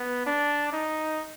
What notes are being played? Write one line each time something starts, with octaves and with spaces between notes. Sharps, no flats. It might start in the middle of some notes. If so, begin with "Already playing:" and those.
Already playing: B3
D4
D#4